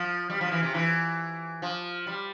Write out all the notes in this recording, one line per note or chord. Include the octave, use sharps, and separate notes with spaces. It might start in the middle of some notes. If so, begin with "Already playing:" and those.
Already playing: F3
G3
F3
E3
C3
E3
F3
G3